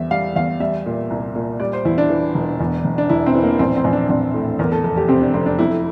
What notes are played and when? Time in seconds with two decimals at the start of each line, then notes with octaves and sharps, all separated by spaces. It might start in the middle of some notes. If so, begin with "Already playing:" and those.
Already playing: E2 G3 E5
0.11 G3 F5
0.36 E2 F5
0.60 G3 E5
0.86 A#2
1.10 C2
1.35 A#2
1.60 G3 D5
1.73 C5
1.85 E2 E4
1.98 D4
2.10 E3
2.35 E1
2.60 E2
2.84 E1
2.98 D4
3.09 E1 E4
3.26 C4
3.35 E3
3.43 A#3
3.59 A#1 C4
3.76 C4
3.84 A#1
3.93 D4
4.09 A#1 C4
4.34 A2
4.59 E2 A#4
4.72 A4
4.84 F1 A4
4.97 G4
5.08 C3 C4
5.21 D4
5.34 F1 C4
5.46 D4
5.59 F2 E4